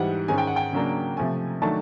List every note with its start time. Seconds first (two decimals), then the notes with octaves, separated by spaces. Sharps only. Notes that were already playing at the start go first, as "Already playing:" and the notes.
Already playing: G#2 E3 G3 F#5
0.28 G#2 D#3 G#3 C#4 G#5
0.38 G5
0.47 F#5
0.56 G5
0.73 C#3 F#3 A#3 D4
1.17 C3 F3 A3 G#5
1.62 D#3 F#3 A3 D4 A5